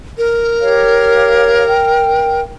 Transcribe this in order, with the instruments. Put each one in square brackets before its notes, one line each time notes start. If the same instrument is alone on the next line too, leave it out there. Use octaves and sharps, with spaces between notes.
[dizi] A#4
[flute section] G4 C#5 F5
F5 G5